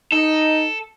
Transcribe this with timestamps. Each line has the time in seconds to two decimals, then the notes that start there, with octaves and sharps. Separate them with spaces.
0.12 D#4 A4